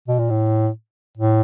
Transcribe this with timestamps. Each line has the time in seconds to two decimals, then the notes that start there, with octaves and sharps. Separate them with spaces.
0.08 B2
0.19 A#2
0.30 A2
1.18 A2